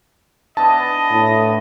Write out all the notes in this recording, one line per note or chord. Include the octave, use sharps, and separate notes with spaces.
B3 D4 E4 D#5 A5
A2